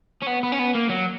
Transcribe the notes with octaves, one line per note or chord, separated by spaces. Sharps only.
C#4
B3
B3
C#4
B3
A#3
F#3